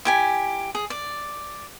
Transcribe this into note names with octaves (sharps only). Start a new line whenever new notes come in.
E4 G4 G#5
G#4
D5